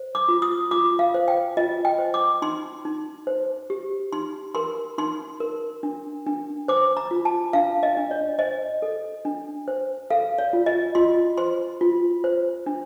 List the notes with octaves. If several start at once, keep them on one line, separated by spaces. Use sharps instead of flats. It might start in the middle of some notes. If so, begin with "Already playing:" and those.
Already playing: C5
D6
F4
D#6
F4 D6
F5
C5
G5
F4 D#5
G5
C5
D6
D#4 C6
D#4
C5
G4
D#4 C6
A#4 C6
D#4 C6
A#4
D4
D4
C5 D6
A#5
F4
A5
D4 F5
D#5
D4
D5
C5 D#5
A4
D4
C5
A4 F5
D5
F4
D#5
F4 C6
C5 C6
F4
C5
D4